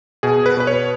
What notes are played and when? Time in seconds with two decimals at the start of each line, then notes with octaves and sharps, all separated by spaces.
0.23 B2 G#4
0.46 B4
0.57 B2 B4
0.67 C#5